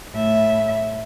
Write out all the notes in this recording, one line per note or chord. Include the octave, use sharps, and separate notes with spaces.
A2 E5